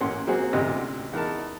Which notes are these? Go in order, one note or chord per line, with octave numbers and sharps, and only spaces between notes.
A1 A#3 C#4 F#5 C6
F#3 A#3 C4 G#4 F#5
A1 D2 C3 D#5
E2 D#4 A#4 A5